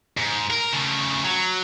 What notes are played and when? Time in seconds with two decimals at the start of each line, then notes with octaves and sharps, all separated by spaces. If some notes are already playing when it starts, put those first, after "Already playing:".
0.17 G#2
0.51 A#4
0.73 C#3 A3
1.24 F#3